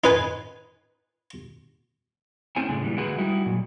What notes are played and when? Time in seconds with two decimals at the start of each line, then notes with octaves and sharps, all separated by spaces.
0.04 D#4 B4 G#5
2.56 A3 C4 C#4 E4 C5 G#5
2.69 A2 C#3 G#3 D4
2.82 A#2 E3 G3
2.97 D3 G#3 A3 F#4 G#4 B4
3.18 G3 D#4 E4 F#4
3.46 A#2 F#3